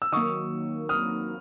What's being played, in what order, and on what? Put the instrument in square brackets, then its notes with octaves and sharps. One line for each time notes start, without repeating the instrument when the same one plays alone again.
[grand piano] E6
[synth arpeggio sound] D#3 F#3 A#3 [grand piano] C#6 D#6
[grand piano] D#6 F6